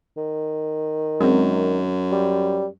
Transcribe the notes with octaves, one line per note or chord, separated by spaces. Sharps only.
D#3
F#2 G#3 C4
G3